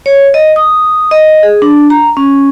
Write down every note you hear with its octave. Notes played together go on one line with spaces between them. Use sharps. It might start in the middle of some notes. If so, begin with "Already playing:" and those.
C#5
D#5
D#6
D#5
G#4
D4
A#5
C#4